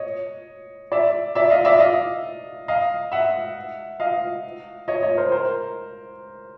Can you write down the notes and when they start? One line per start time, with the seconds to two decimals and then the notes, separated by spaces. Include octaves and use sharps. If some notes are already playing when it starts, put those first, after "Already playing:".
Already playing: C#5 D#5
0.92 D5 E5
1.35 D5 E5
1.50 D#5 F5
1.65 D5 E5
1.79 D#5 F5
2.68 D#5 F5
3.12 E5 F#5
4.00 D#5 F5
4.88 C#5 D#5
5.03 C#5 D#5
5.17 A#4 C5
5.32 A#4 C5